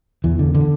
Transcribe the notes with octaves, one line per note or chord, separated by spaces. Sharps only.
E2 E3
D3
D3